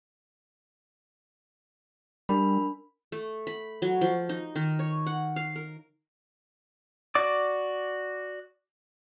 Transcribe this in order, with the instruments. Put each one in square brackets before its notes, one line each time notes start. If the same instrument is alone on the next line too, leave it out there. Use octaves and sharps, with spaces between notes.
[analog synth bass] G3 [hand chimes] D4 A#4 B5
[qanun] A3
B5
F#3
F3
D#4
D#3
C#5
F#5
F5
A#4
[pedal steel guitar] F#4 D5 D6